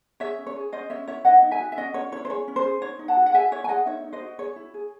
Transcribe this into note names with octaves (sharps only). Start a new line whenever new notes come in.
G#4 C#5 E5
C#4
C#5
G#4
C#4 C5 D#5
C#4 C#5 E5
E4 C#5 E5
D#4 D#5 F#5
D#4
E5 G#5
F#4
E5
C#4 D#5 F#5
C#4 C#5
E4 C#5
C5
G#4 C#5
C#4
C5
G#4
D#4 C#5
D#4
F#5 A5
F#4
F#5
G#4 E5 G#5
E4 C#5 E5
G#5
G#4 D#5 F#5
D#4 C#5 E5
D#4
C5 D#5
F#4
G#4 C#5
E4
G#4